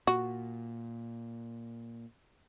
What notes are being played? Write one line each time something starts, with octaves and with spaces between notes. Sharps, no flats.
A#2 F#4